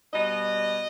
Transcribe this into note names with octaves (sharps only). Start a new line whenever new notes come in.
B2 G3 D#5